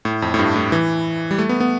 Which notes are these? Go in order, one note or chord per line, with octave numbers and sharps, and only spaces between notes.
A2
F2
A2
G2
A2
E3
G3
A3
B3
B3